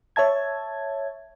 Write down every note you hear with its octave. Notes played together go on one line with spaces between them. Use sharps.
C#5 E5 A5 G#6